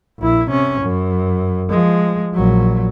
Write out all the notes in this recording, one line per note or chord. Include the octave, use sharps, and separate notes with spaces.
A#1 E4
C3 C#4
F#2
F3 G#3
A#1 F#3